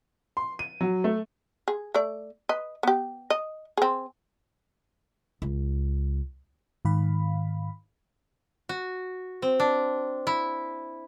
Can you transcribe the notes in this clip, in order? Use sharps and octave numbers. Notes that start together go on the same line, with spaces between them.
C6
D#7
F#3
A3
G#4
A3 D5
B4 D#5
B3 G4
D#5
C4 G#4
C#2
G#2 D#3 F5 B5
F#4
C4
D4
E4